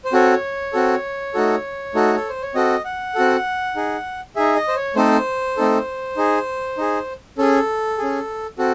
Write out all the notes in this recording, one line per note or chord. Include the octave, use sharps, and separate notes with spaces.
C5
C4 F#4 A4 C#5
C4 F#4 A4
A3 D#4 F#4 A4
A3 D#4 F#4 A4
A4
C5
C#5
C4 F#4 A4 D#5
F#5
C4 F#4 A4
D#4 G#4
D#4 G#4 E5
D#5
C5
C#5
A3 C4 D#4 A4 C5
A3 C4 D#4 A4
D#4 G#4
D#4 G#4
C#4 G#4 A4
C#4 G#4
C4 F#4 A4